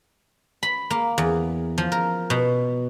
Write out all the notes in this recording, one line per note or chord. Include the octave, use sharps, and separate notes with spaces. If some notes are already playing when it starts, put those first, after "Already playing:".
B5
A#3
E2
F3
A#4
B2